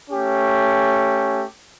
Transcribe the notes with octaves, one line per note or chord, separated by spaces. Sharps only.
A3 C#4 G4